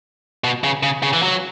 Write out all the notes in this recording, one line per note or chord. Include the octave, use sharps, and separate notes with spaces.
B2
C#3
C#3
C#3
E3
F#3